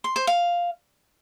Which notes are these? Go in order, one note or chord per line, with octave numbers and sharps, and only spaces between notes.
C6
C5
F5